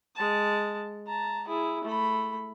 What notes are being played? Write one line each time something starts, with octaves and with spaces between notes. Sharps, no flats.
G#3 A5
A5 A#5
E4 G#4
A3 B5